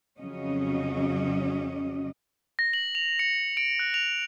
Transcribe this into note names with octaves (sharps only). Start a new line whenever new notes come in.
F2 C#3 F#3 C#4 D#5
A#6
F#7
F7
C#7
D7
F#6
F7